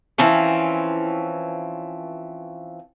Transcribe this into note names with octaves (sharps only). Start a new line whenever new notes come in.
E3 F3 C4 C#4